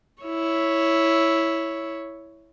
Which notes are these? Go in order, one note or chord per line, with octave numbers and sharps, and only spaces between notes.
E4 C#5